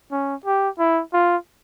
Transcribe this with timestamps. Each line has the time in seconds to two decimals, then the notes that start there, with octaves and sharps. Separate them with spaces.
0.11 C#4
0.46 G4
0.78 E4
1.13 F4